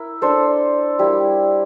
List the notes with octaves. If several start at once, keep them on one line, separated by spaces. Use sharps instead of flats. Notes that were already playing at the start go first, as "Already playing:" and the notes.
Already playing: E4 A#4
D4 A4 C5
G3 A#3 E4 G4